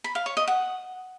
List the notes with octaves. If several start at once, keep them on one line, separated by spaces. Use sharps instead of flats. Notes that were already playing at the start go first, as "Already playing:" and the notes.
B5
F5
C#5
D#5
F#5